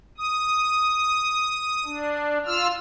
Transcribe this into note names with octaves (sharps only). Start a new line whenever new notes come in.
D#6
D4
F4 E6 F6